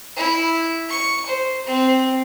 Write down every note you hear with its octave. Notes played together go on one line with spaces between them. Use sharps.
E4
C#6
C5
C4